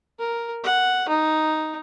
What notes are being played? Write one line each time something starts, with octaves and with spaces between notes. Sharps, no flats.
A#4
F#5
D#4